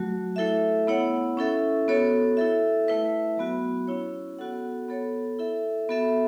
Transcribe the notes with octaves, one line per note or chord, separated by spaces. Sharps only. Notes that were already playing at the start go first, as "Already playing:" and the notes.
Already playing: F#3 A3 F#4
A3 E4 A4 E5
B3 E4 C#5 F#5
C#4 E4 A4 E5
B3 F#4 A4 C#5
E4 A4 E5
A3 E4 B4 E5
F#3 B3 F#4
C#4 E4 C#5
B3 F#4 A4 F#5
B3 A4 C#5
E4 A4 E5
B3 F#4 A4 E5